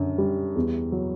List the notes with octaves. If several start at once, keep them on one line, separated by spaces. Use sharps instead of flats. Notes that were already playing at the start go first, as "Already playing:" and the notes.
Already playing: F#2 D3
G3
E2
F#3